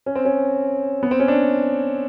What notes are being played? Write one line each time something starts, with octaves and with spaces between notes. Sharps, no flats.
C#4
C4
C#4
B3
C4
C#4
D4